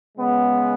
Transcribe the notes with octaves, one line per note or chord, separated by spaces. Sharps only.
C#3 G#3 B3